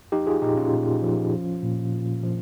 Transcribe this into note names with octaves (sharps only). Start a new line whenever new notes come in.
F3 D#4 G4
F4 G#4
A#2 D#4 G4
C#4 F4
A#2
F3
F3
A#2
A#2
F3